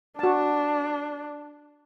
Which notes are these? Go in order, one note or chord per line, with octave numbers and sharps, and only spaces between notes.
D4 F#4 A5